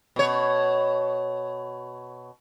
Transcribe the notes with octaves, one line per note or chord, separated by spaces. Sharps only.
B2 C#5